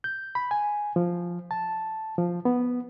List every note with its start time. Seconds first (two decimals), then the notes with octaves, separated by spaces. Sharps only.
0.04 G6
0.35 B5
0.51 G#5
0.96 F3
1.51 A5
2.18 F3
2.45 B3